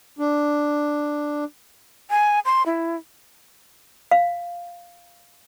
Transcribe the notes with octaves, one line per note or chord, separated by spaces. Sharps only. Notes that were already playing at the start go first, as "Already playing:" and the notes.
D4
G#5
C6
E4
F5